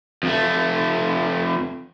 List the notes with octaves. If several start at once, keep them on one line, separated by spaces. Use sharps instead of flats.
F2 A3